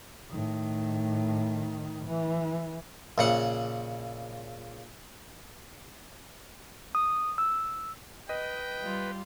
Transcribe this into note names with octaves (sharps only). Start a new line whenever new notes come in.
A2 D#3
E3
A#1 C#3 F#5
D#6
E6
B4 D#5 G5
G3 F4